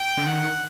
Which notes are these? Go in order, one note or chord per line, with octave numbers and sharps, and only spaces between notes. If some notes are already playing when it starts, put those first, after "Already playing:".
Already playing: G5
D3
D#3 F#5